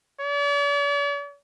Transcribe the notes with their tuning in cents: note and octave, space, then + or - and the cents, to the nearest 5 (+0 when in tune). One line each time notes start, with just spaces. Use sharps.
D5 -45